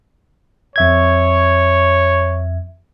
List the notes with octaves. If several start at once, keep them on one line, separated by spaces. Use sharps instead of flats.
F2 C#5 E5 G#6